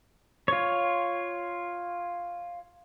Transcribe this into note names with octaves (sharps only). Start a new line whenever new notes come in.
F4 C#5